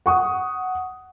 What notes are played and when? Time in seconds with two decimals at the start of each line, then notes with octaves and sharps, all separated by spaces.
0.06 F#5 C#6 D#6